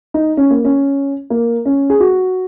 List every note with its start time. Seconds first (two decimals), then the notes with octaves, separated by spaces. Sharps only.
0.14 D#4
0.37 C#4
0.51 A#3
0.65 C#4
1.30 A#3
1.65 C#4
1.90 G#4
2.00 F#4